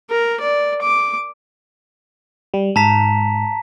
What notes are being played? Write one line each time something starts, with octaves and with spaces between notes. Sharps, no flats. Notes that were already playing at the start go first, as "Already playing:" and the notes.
A#4
D5
D6
G3
G#2 A5 A#5 B6